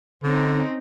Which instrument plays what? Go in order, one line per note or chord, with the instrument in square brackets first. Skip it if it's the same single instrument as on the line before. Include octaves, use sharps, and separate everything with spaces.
[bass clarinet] D3 [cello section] C4 C#4 D#4